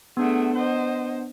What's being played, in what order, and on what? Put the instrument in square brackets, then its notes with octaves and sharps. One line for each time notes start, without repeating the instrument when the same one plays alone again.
[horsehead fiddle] A3 G#4 [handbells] B3 D4 F#5
[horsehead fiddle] C5 D#5